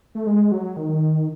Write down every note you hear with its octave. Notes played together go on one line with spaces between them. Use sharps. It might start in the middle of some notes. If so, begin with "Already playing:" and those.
A3
G#3
F#3
D#3